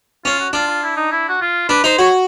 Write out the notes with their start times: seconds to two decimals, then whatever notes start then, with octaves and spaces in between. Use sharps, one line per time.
0.25 C#4 F4
0.40 F#4
0.53 D4 F4
0.68 F4
0.83 E4
0.97 D#4
1.12 E4
1.29 F#4
1.41 F4
1.69 D4 B4
1.84 D#4 C5
1.98 F#4 C#5